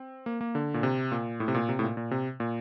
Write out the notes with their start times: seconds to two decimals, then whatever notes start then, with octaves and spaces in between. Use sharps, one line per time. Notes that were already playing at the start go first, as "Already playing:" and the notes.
Already playing: C4
0.26 A#3
0.41 A#3
0.55 D3
0.74 A#2
0.83 C3
1.12 A#2
1.40 A2
1.48 C3
1.55 A#2
1.69 C3
1.79 A2
1.83 A#2
1.97 A#2
2.11 C3
2.40 A#2